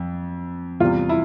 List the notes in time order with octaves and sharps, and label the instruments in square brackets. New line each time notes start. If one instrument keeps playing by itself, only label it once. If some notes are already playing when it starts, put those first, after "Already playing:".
Already playing: [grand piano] F2
E2 C3 G3 F4
E4